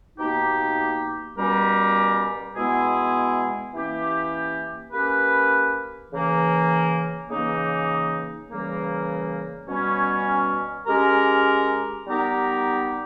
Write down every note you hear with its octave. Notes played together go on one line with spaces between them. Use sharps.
B2 A#3 D#4 G4
B2 G3 C#4 G4 A#4
B2 G#3 B3 E4 G#4
E3 A#3 C#4 G4
A#3 C#4 G4 B4
C#3 E3 A#3
C#3 E3 A#3 D#4
C#3 E3 G3 A#3
B2 G3 C#4
G#3 C#4 G4 A#4
G3 B3 D#4 G4 A#4